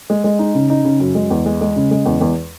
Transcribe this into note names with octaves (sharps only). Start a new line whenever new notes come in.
G#3
G#3
D#4
C#3
D#4
C#3
F#2
G#3
E2
G#3
G#3
C#3
G#3
E2
E2